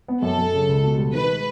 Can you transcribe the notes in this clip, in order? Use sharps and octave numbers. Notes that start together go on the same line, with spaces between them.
B3
F#2 A4
F#2
C#3
C#2
B2
G3
D#3 B4
G#3